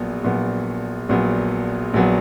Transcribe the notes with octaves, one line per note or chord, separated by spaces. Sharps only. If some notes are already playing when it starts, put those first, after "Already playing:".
Already playing: A#1 A#2 F#3 B3
A#1 A#2 F#3 B3
A#1 A#2 F#3 B3
A#1 A#2 F#3 B3